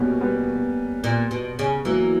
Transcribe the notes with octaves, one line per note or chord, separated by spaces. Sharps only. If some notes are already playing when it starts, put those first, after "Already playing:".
Already playing: B2 G3 A#3 B3 C#4
G3 B3
A#2
B2
C#3
E3 F#3 A#3